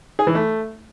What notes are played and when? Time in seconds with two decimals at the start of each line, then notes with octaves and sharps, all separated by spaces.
0.19 G#4
0.27 E3
0.35 A3